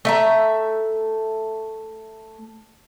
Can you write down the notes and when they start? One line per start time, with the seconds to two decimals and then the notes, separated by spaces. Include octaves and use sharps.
0.05 A3 E5 A#5